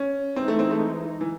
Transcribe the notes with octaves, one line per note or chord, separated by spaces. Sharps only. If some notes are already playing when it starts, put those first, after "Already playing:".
Already playing: C#4
E3 G#3 C4 D#4
A3
C4
A3
E3